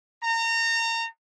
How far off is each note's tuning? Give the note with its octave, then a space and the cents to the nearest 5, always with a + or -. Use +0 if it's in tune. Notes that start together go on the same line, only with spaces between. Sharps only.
A#5 -30